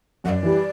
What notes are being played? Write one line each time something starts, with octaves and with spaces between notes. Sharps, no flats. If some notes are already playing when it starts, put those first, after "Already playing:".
F#2 F#5
D5
E3 G3